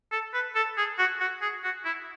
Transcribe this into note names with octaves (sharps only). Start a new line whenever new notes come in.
A4
B4
A4
G#4
F#4
F#4
G#4
F#4
E4